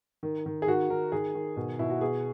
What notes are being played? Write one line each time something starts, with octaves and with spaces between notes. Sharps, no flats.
D#3
D#3
G#4
D#3 F#4
D#3 A#4
D#3 G#4
D#3
B2
B2 E4
F#4
B2 G#4